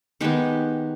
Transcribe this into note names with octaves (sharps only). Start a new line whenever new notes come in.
D#3 G#3 B3 G4